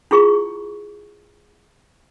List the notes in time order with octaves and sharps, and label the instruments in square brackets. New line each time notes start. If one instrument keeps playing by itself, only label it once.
[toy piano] E4 F4 G#4 C#6